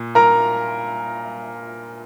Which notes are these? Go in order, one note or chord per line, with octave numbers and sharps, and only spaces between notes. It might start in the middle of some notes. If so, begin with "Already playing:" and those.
Already playing: A#2
A#4 A#5